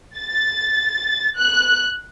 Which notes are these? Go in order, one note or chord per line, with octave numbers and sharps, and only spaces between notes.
A6
F#6